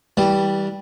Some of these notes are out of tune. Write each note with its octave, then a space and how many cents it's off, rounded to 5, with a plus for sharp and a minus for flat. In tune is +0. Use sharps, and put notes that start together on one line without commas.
E3 -30 G3 +0